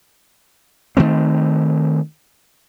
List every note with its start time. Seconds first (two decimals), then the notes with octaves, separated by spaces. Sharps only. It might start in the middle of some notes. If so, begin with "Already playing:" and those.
0.97 D#3 F3 A3 C4